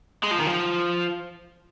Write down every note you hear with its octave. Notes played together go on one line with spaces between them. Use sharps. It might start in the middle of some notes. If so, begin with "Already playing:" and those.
G#3
F3
D#3
F3